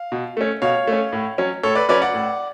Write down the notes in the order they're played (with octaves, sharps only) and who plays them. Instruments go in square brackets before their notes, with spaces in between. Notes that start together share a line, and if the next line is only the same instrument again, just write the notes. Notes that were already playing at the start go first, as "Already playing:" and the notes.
Already playing: [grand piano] F5
B2
A3 C#4
B2 C#5 F5
A3 C#4
A2
F#3 C#4
A2 A4 C#5
B4 D5
F#3 C#4 B4 D5
D5 F#5
A2